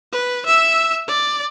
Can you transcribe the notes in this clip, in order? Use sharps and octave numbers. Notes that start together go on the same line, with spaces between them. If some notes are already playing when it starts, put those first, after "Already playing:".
B4
E5 E6
D5